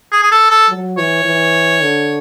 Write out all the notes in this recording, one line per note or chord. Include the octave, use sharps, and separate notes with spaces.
G#4
G#4
A4
A4
F#3
E3 C#5
E3
D3